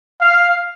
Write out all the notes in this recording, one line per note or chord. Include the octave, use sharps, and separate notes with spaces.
F5